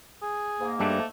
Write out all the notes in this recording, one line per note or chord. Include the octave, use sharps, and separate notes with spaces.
G#4
G#2 A#3
G2 G3 A3 D4